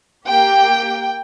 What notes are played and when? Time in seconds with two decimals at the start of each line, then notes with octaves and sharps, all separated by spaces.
0.26 A#3 G4 G5